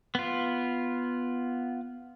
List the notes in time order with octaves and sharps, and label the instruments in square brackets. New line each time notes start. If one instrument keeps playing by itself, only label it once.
[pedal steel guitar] B3 F4